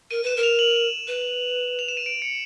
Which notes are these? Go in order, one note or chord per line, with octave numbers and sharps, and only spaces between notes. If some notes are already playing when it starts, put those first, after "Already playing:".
A#4 D#7
B4 E7
A#4
F7
F#7
B4
F7
E7
D#7
D7
C#7